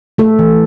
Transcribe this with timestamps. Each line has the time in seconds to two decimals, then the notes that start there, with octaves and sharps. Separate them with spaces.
0.18 A3 A4
0.39 E3